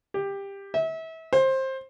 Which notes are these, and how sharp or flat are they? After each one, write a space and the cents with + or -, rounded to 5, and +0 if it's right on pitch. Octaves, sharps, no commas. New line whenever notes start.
G4 +15
E5 -30
C5 +20